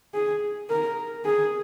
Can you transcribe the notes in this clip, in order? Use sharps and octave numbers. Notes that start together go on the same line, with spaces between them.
G#4
A#4
G#4